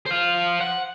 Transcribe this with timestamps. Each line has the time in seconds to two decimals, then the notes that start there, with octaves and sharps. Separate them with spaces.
0.06 C5 F5
0.61 F#5